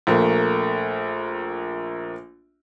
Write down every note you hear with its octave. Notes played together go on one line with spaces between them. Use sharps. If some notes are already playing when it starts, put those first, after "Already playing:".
A#1 A3 A#3